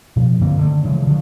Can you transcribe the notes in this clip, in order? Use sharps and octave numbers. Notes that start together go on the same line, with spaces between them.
B2 F3
G2 D3 A#3 C4
D3 D#3 A3
C#3 E3 F3 G#3
D3 F3 F#3